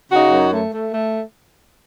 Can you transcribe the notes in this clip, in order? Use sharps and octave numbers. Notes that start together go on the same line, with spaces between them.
C#3 D#4 F#4
F#2
A3
A3
A3